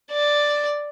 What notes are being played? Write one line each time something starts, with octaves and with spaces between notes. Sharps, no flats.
D5